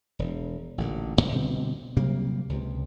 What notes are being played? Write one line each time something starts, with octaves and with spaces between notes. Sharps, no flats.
E1
A1 A#2 D3
E1 B1
B2 D3 G3 C4
C3 F#3 G3 A#3
C#2 C3